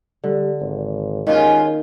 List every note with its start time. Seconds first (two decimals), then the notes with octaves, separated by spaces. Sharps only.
0.24 D3 G3
0.60 G#1
1.27 D#2 D#3 G#3 A#3 C#4 F4